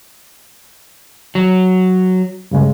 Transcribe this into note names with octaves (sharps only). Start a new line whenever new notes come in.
F#3
G2 C#3 G#3